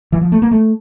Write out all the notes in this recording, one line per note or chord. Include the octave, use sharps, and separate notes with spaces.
E3
F3
A3
A#3
A3